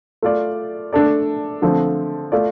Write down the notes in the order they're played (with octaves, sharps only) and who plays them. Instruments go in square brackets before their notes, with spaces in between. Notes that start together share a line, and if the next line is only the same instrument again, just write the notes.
[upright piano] A3 F4 D5
A3 D4 A4 D5
D3 F3 A3 C4
A3 F4 D5